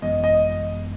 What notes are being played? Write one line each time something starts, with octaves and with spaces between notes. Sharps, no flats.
G#1 F#2 E3 G#3 B3 D#5
D#5